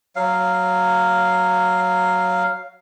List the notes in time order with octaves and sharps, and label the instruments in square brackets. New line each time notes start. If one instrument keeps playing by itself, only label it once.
[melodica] F#3 F5